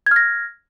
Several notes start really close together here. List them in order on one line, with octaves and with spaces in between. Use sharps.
G#6 F6 A#6